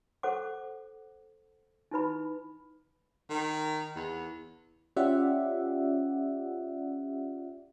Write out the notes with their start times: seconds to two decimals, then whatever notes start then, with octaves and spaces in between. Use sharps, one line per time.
0.23 A4 C5 F#5 D6
1.91 D#4 E4 B4 B5
3.30 D#3
3.96 E2
4.96 C#4 F4 G4 D5 E5 F#5